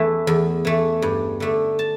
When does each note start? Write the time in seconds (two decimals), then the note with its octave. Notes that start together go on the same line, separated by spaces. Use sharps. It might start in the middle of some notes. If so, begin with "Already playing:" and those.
Already playing: E2 E3 A3 E5
0.27 E2
0.65 E3 A3
1.02 G2
1.40 D3 A3
1.79 A5